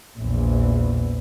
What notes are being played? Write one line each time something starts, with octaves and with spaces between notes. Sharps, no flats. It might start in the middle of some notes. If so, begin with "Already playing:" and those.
A#1 E2